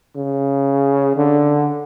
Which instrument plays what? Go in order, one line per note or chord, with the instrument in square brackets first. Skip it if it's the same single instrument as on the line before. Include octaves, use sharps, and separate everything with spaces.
[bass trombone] C#3
D3